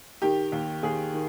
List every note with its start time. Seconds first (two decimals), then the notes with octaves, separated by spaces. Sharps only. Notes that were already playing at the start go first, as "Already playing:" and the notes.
0.22 D#3 G4
0.52 D#2
0.83 D#2 G#4
1.13 D#3